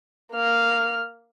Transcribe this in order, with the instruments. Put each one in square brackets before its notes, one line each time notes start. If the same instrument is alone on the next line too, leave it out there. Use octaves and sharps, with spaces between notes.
[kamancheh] A#3 F6